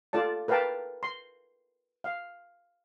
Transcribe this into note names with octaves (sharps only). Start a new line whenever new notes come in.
F4 A4 D5 A5
A#4 B4 F5 G5 A5
C6
F5